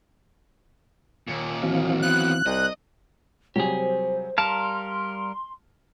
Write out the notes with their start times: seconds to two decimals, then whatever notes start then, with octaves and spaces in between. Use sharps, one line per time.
1.28 D#2 A#2
1.63 E3 F#3 C4 F5
2.02 D#3 B3 F#6
2.46 C2 D#5
3.56 C3 F#3 G3 G4 G#4 C5
4.38 G3 A#4 F5 A5 A#5 C6 F6